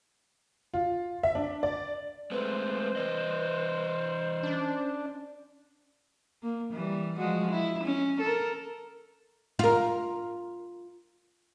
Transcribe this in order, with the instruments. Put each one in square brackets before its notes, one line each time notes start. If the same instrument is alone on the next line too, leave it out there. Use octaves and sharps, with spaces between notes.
[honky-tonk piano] F4
E5
D4
D5
[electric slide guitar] G#3 A3 C4 [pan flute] B4 [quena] C5
[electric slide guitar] E3 D5 D#5 [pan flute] B4
[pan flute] C#4 [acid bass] D4
[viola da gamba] A#3
E3 G3
F3 G#3 F#4
E4
C#4
A4 A#4
[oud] F4 A#4